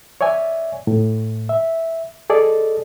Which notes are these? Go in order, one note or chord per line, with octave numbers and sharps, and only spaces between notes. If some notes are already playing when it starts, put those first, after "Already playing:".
C#5 D5 E5 G#5
A2
E5
G#4 A4 D5 D#5